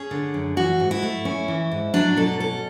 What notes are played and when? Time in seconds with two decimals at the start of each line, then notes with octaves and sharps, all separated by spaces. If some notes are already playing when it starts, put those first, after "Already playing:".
Already playing: C#4 G#4
0.11 D3
0.34 F#2
0.56 E3 F#4
0.80 G#2
0.91 E4
1.03 A3
1.25 C#4
1.48 E3
1.71 G#2
1.94 F#3 D4
2.17 B2 A4
2.40 C#4 A4